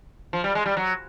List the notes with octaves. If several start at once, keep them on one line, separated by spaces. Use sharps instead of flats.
F3
G3
G#3
G3
F#3